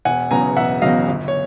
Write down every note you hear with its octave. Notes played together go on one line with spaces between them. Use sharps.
E1 F#5 G#5
E2 C#3 F#3 G#5 A#5
E1 E5 F#5
E2 C#3 F#3 D#5 F5
G1
C#5